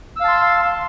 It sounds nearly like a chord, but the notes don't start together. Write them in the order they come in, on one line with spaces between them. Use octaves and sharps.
E6 F5 A5 C6